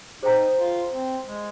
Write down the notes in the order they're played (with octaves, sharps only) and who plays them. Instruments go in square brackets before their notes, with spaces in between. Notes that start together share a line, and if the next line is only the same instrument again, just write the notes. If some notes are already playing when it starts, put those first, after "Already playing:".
[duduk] D#4 [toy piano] G#4 C5 G5 A#5
[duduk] F4
C4
G#3